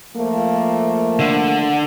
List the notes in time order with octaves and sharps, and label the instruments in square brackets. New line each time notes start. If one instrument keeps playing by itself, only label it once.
[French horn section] F3 A3 A#3
[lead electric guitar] D3